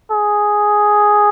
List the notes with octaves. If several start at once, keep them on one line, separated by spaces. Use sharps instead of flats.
G#4